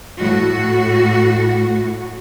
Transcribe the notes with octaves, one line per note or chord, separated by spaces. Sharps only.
A2 F#4